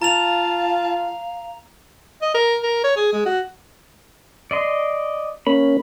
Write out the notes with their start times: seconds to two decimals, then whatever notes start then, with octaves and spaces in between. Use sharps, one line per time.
0.02 F4 F5 A5 A#5 F7
2.22 D#5
2.35 A#4
2.63 A#4
2.84 C#5
2.97 G#4
3.13 G#3
3.26 F#4
4.51 D5 D#5 C6
5.47 A#3 C#4 B5